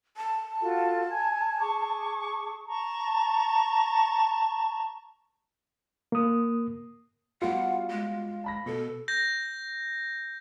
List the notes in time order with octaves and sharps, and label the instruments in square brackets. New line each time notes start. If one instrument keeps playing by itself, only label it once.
[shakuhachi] A5
[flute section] F4 F#4 A4
G#5 G#6
G#4 C#6 D6
A5 A#5 C#6
[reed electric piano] A#3 D#6
[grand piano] G3 B3 F#4 [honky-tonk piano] F4 [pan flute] F#5
[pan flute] G#3
[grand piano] A5 B5 A#6
[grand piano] B2 [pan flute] A4
[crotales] G6 A#6